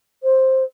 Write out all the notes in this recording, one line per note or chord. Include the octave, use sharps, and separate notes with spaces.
C5